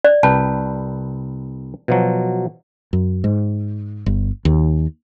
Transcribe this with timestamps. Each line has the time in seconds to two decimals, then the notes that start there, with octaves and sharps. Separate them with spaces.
0.04 D5
0.23 C2 B4 G5 A5
1.88 B2 F3 F#3
2.93 F#2
3.24 G#2
4.06 G1
4.45 D#2